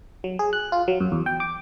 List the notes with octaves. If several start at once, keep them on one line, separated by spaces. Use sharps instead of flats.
F#3
G#4
F#6
F4
F#3
F#2
E2
G5
D6